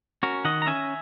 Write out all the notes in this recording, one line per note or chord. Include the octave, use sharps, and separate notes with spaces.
C#4 F#4 A#4
D#3 D#5 F#5
A#5
C#4 E5 G#5